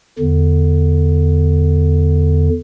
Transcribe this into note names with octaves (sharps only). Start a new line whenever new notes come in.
E2 D3